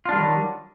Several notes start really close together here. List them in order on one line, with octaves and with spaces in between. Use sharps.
F4 D4 G3 D#3 F#3